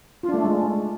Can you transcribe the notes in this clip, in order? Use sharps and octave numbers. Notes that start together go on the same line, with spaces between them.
F4
D4
A3
D4
G#3